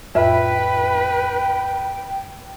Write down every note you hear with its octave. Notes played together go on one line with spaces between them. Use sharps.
F2 A2 F4 B4 E5 G5